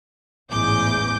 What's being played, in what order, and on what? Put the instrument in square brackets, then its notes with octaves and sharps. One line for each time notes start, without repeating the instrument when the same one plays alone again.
[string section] A1 E2 G#2 G#4 D6 G6